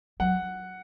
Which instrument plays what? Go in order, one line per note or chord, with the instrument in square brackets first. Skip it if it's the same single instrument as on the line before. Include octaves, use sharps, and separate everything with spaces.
[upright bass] F#3 [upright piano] F#5